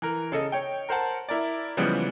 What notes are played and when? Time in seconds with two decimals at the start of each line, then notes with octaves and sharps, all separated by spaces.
0.02 E3 A#4
0.32 C#3 A4 D#5
0.52 C#5 G5
0.89 A#4 C5 F#5 A5
1.29 E4 A#4 D5
1.77 C#3 E3 F3 G3 G#3 B3